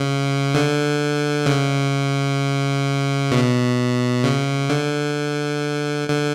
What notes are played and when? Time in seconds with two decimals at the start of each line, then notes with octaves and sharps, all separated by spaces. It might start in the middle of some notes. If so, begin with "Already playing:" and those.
Already playing: C#3
0.55 D3
1.46 C#3
3.31 B2
4.24 C#3
4.69 D3
6.08 D3